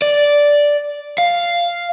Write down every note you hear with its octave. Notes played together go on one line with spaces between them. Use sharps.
D5
F5